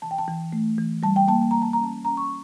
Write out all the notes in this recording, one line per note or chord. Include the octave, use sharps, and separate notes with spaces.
E3 A5
G5
A5
E3
A3
E3
G3 A5
G5
A#3 A5
A5
A#3 A#5
A5
A#5
C#4
A5
C#4 A#5
C#6